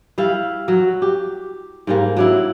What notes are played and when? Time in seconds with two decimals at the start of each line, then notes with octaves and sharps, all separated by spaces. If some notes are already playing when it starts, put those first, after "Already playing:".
0.18 G3 E4 E5 F5
0.68 F#3 F#4
1.02 G4
1.87 G#2 G3 A#3
2.16 F#3 D4 E4